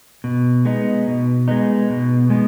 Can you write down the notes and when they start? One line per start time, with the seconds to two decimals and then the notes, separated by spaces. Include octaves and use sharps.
0.24 B2
0.65 G#3 B3 D#4
1.07 B2
1.48 G#3 B3 D#4
1.90 B2
2.30 G#3 B3 D#4